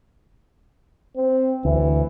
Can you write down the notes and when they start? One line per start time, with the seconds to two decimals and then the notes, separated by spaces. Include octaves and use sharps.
1.16 C4
1.65 D2 E3